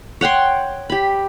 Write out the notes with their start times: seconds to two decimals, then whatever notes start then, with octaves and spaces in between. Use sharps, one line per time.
0.21 C#5 F#5 G5 C6
0.90 G4 B5